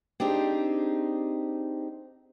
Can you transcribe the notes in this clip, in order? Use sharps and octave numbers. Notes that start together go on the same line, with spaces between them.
C4 D4 D#4 G4 G#4 C5